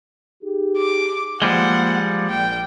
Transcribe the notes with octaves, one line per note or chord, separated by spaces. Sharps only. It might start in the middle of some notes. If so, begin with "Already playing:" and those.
D#4 G4 G#4
D6
F3 G3 G#3 A#3 F#5
A#1 G5